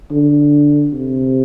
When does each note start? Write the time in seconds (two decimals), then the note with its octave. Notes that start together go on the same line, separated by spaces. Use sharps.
0.11 D3
0.93 C3